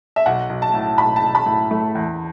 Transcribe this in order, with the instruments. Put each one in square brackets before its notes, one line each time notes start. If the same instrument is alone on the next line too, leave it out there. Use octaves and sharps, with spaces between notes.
[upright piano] E5
[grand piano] B1 [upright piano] F#5
[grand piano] B1
[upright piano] A5
[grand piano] A2
[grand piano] B1 [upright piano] B5
[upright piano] A5
[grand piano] B1
[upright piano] B5
[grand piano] A2
A3
E2